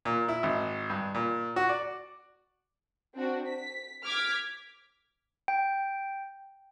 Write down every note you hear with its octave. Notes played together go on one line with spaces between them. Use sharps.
A#2
E4
G#1
G2
A#2
F#4
D5
C4 D4 F#4
B6
D6 F6 G#6 B6
G5